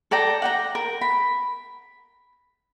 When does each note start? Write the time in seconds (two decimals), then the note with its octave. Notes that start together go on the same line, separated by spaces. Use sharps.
0.11 A4 D5 G5 A#5
0.42 F#5 G5 A#5
0.75 A#4
1.01 B5